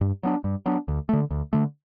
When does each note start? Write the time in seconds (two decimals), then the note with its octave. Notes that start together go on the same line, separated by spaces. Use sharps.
0.01 G2
0.23 F#3 B3 D4
0.44 G2
0.66 F#3 B3 D4
0.88 D2
1.09 D3 A3
1.31 D2
1.53 D3 A3